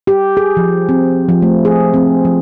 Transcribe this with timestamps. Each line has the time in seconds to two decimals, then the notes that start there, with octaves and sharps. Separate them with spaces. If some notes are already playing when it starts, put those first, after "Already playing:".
0.07 G4
0.37 G#4
0.57 F3
0.89 C4
1.29 F3
1.42 A3
1.65 G#4
1.94 C4
2.25 F3